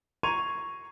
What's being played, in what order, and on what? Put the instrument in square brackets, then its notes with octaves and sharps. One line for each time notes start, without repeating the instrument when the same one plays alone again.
[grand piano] A#5 C6 C#6 G#6 D#7 F7